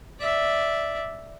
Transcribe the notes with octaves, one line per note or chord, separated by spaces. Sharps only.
D5 E5